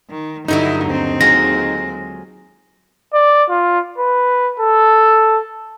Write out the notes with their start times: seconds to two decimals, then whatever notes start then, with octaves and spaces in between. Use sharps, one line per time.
0.10 D#3
0.48 G2 D3 F#3 D#4 E4 D#5
0.85 D#2 C4
1.21 F#3 G#3 F4 A#6
3.14 D5
3.50 F4
3.98 B4
4.60 A4